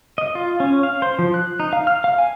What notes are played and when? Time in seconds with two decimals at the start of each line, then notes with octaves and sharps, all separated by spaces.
0.18 D#5
0.35 F4
0.60 C#4
0.83 F5
1.02 C5
1.19 F3
1.34 F#6
1.60 D#4
1.73 F5
1.87 F6
2.04 F5
2.18 G#5